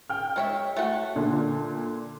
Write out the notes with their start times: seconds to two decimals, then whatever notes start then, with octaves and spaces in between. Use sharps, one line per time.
0.10 G5 F6
0.36 G#3 C#5 E5
0.77 A3 F#4
1.16 A#2 D3